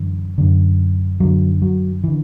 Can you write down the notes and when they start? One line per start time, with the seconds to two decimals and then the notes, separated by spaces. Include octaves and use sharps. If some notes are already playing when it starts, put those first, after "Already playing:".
Already playing: F#2 D3 E3
0.38 F#2 D3
1.20 F#2 D3 F#3
1.62 F#3
2.04 D3 E3